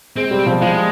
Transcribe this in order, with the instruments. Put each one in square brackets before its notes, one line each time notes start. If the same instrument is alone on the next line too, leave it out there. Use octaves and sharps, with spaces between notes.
[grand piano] G#3 [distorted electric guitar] C4
[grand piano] G3
F3
[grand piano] F3 [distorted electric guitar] G#3